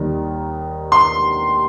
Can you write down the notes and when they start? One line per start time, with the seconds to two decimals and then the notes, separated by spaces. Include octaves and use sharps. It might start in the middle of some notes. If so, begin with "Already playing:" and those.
Already playing: D#2 D#3 G3
0.92 C6